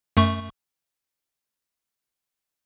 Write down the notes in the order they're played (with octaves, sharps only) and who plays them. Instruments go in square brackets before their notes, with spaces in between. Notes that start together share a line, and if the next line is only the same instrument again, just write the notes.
[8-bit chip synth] F#2 A3 C#6